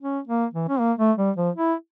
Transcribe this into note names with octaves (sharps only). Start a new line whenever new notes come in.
C#4
A#3
E3
C#4
A#3
A3
G3
F3
E4